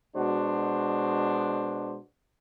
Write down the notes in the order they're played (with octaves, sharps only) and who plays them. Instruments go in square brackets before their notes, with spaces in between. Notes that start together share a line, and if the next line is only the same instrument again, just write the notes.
[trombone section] B2 G#3 D4 F#4 C5